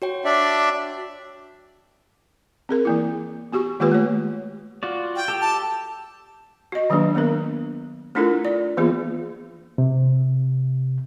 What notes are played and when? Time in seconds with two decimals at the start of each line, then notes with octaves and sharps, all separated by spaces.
0.02 F#4 C#5 G5
0.25 D4 D5 E5
2.69 C4 G#4 A#4
2.85 E3 A#3 E4
3.52 B3 F#4 G4 C#6
3.80 D#3 G#3 A#3 F4 G4 B4
3.92 A3 C#5
4.83 F4 F#4 D5
5.16 G5
5.28 G4 A4
5.41 A5
6.72 F#4 D#5
6.90 D#3 F#3 G#3 A#3 D4
7.15 A#3 B3 D4 A#4
8.15 A3 D4 E4 F4 A4 A#4
8.45 D5
8.77 E3 A#3 B3 F4 G#4
9.78 C3